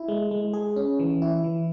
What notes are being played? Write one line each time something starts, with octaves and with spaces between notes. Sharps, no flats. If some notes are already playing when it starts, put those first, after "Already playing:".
Already playing: E4
G#3
G#3
G#4
C#4
E3
E4
E3